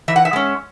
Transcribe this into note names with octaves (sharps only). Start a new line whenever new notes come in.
E3 E5
F#5
E5
G#3 C#4